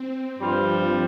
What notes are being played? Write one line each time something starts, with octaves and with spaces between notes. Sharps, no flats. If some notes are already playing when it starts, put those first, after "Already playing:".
Already playing: C4
G2 F3 G3 F4 C5